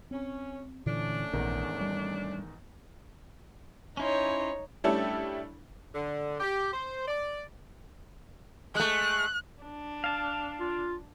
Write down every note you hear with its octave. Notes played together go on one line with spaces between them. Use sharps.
C4 C#4
A#2 D3 E3 A3 C#4 D4
A#1 E2 G#2 D#3
G3
C#4 D#4 E4 C5 C#5
G3 A3 C#4 D4 E4 A4
D3
G4
C5
D5
G#3 A3 F#6
D4
F5 A5
F4